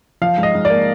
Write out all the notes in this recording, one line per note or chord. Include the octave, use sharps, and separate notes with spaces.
F3 F5
G#2
D#5
G#2
D5
A#3